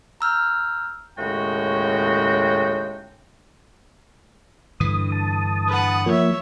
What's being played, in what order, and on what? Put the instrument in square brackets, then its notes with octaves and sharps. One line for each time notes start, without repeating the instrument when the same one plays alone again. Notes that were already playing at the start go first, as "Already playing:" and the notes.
[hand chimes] A#5 E6 F6 G6
[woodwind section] D#2 A2 C#3 G#3 F#4 G5
[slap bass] G2 D3 E3 [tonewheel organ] D#6
[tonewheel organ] A5 D#6
[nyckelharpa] B4 F#5
[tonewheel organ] F3 A#3 [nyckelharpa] C#5 E5